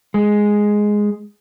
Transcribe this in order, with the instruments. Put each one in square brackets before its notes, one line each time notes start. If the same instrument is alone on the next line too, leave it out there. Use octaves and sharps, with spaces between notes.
[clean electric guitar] G#3